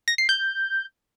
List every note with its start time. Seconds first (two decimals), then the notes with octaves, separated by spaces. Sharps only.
0.08 A#6
0.18 C7
0.29 G6